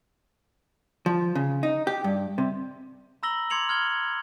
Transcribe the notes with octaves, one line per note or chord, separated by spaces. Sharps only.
F3
C#3
D#4
G4
G2
C3
A#5 B5 E6 A#6 F#7 G7
C6 D6 G#6 C#7 F7 F#7
F6 G#6 G7